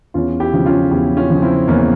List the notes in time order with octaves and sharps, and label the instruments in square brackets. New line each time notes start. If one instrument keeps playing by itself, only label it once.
[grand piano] E2 C#4 F4
E4 G4
C#3 F3
C#4 F4
E2 E4 G4
C#4 F4
C#3 F3
C4 E4
E2 A#3 C#4